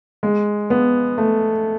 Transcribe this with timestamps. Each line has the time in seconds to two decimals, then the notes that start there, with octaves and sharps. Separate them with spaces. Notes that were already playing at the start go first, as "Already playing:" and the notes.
0.23 G#3
0.70 B3
1.18 A3